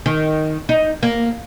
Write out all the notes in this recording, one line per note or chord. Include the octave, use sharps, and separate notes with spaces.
D#3
D#4
A#3